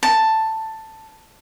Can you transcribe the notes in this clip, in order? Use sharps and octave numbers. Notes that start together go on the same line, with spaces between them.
A5